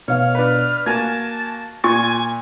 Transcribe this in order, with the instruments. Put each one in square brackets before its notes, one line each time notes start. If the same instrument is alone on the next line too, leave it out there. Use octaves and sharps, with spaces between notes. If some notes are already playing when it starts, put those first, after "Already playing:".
[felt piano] B2 F5 [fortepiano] C#5 [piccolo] F6
[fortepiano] D4 B4
[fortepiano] A#3 F#4 G#5 [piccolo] A5 [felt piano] G#6
[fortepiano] A#2 [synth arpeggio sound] F4 C#6 A6 [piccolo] G#5